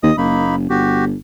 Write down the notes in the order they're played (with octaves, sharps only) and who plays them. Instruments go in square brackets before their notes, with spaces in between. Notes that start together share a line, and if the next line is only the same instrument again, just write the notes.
[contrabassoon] D#2 [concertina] D#5 D#6
[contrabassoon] F#1 [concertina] A#3 D#4 B5
[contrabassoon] G1 [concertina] F#4 G4